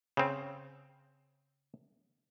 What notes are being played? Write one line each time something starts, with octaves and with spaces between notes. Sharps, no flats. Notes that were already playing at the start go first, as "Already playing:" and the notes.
C#3 C4